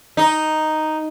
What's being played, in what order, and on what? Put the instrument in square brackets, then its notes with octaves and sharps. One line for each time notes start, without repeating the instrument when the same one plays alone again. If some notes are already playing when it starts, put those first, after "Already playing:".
[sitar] D#4